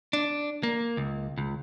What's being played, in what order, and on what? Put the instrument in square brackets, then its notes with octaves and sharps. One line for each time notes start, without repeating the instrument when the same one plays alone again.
[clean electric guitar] D4
A#3
C#2
C#2